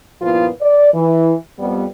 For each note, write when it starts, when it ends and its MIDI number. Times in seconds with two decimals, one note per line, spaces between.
0.22 0.48 43
0.22 0.48 46
0.22 0.48 53
0.22 0.48 59
0.22 0.48 64
0.22 0.48 65
0.62 0.93 74
0.93 1.34 52
1.59 1.86 41
1.59 1.86 55
1.59 1.86 59